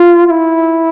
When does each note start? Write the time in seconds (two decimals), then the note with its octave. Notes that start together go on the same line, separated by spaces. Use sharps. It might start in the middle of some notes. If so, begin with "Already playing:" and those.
Already playing: F4
0.26 F4
0.30 E4